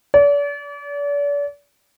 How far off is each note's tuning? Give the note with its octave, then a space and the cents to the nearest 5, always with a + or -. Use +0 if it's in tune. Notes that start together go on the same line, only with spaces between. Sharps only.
D5 -40